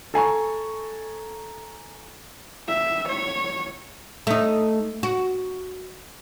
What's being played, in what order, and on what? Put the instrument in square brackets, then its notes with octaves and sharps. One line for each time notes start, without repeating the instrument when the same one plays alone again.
[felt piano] A4 G#5 A#5 C#6
[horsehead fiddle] E5
C#5
[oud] A3 D#4
F#4